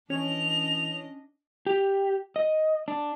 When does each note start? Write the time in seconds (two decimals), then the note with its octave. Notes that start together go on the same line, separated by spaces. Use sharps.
0.10 E3 C#4 D4 D#5 F7
1.66 G4
2.36 D#5
2.88 D4